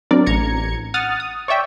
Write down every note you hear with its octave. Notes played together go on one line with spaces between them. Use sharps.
F#3 C4 D4 A#4 D5
A1 A#5 G#6 C#7
F#5 D#6 F6 A6
D#6
C#5 D5 E5 G5